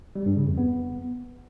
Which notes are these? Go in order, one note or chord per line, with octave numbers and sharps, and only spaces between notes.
G3
G2
C#3
F2
B3